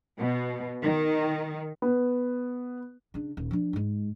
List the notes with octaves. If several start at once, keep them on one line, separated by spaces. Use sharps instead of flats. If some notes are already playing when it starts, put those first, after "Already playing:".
B2
D#3
B3
C#3 D4
D#1
F3 D4
G#2 G#3